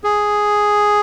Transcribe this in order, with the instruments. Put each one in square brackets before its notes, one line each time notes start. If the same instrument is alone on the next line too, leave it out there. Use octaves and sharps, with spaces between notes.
[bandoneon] G#4